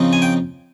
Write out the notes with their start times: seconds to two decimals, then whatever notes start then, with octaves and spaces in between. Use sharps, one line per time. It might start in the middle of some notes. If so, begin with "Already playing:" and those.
Already playing: C#3 F3 C4 D#4
0.13 G#5
0.22 G5